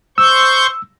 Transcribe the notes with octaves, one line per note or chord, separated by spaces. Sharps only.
C5 C#6 E6 G6